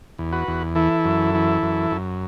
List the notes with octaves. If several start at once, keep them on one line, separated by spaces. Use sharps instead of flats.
E2
F#4 B4
E2
E3 E4 A4
F#2
E3
F#2
F#2